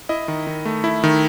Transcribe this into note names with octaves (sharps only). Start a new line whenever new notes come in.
E4 D#5
D#3
D#3
A3
E4
D#3